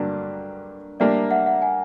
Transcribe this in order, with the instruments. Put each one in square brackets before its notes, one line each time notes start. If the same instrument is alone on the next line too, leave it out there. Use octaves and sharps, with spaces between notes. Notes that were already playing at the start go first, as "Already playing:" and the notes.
Already playing: [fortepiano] G2 D3 F#3 A#3 D4 [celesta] D5
[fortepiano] G3 A#3 D4 [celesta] D5 E5
[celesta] E5 F#5
E5 F#5
F#5 G#5